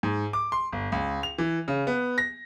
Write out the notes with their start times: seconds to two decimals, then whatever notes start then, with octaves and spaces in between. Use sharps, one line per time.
0.03 G#2
0.33 D6
0.52 C6
0.72 G1
0.92 C#2
1.23 F7
1.38 E3
1.68 C#3
1.87 B3
2.18 A#6